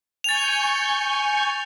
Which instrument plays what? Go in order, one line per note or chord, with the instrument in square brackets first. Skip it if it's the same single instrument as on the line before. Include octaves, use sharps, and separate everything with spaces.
[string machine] G#5 C#6 G6 [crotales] A6 F7